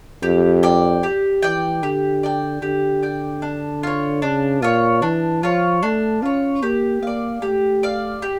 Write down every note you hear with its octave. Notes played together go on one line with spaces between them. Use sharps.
F2 G4
D5 G5
G4
E3 D5 G5
D3 G4
D5 G5
D3 G4
D5 G5
D4
F4 C#5
C#3 D4
A#2 F4 C#5
E3 D4
F3 F4 C#5
A3 D4
C#4 F4 C#5
A#3 G4
A#3 D5 F5
A3 G4
D5 F5
G4